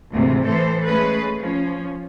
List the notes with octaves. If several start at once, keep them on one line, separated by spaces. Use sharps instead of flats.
D2 G#2 C3 E3
A2 E3 A4 C5
G#3 A3 C#4 G#4 B4
F3 C#4